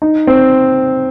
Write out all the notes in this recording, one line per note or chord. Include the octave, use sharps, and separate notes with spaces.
D#4
C4